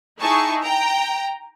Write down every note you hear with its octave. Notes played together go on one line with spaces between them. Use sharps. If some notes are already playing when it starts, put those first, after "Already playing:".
D#4 E4 G#4 A5 C#6
G5 A#5